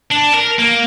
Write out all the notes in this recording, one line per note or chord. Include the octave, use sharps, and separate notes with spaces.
D4
A#4
A#3